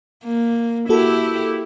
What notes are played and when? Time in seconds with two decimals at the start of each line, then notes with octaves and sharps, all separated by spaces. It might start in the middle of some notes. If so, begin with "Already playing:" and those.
0.24 A#3
0.89 A#3 E4 F#4 G4 A4